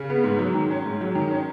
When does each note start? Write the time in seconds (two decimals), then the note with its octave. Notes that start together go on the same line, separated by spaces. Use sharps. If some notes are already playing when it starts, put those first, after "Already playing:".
Already playing: C#3
0.10 B3
0.24 G#2
0.39 F#3
0.54 D#3
0.70 C#4
0.86 G#2
1.01 F#3
1.15 D#3
1.31 C#4